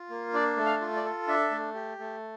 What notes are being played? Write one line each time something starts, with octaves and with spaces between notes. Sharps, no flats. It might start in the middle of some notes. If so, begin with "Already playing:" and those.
Already playing: F4
A#3
D4 D5
A3
F5
F4
D5
A4
D4 E5
A3
G4
A3